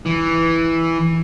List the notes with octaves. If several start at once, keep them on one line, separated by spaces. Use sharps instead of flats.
E3